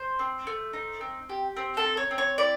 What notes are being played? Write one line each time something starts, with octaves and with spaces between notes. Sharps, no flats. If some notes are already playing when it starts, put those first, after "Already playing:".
Already playing: C5
C4
A3
D#4
C4
G4
C4
A4
D#4
C#5
C4
C#5
E4 D5